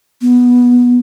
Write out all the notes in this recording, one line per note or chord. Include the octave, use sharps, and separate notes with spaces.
B3